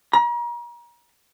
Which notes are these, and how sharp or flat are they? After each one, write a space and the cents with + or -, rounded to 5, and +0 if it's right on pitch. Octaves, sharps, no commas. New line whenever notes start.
A#5 +35